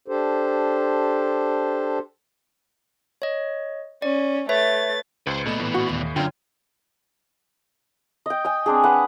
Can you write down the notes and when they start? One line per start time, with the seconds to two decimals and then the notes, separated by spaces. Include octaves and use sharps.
0.08 D4 G4 A4 C5
3.22 C#5 D#5
4.02 C#4 D5
4.49 A3 B4 C#5 E5 A6
5.27 C#2 B4 C5
5.46 A#2 A3 B3 D#5 E7
5.60 A2 E3
5.75 F#4
5.89 D#2
6.16 F#2 D3 C#4 F4 G5
8.26 D#5 G5
8.45 G5 G#5 D#6
8.66 C4 D4 G#4
8.84 B4 F#5